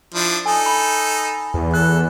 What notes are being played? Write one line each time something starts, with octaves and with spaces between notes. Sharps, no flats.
F3 D4 E4
D#4 A4 G#5
B5
E2
A4 F#6